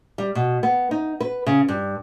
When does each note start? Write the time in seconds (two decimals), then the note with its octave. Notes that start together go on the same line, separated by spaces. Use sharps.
0.18 G3
0.35 B2
0.63 B3
0.91 D#4
1.20 B4
1.46 C#3
1.68 G2